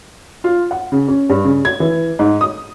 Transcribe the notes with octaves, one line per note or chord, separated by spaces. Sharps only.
F4
F#5
C#3
C#4
G2
C#3
G#6
E3
G#2
D#6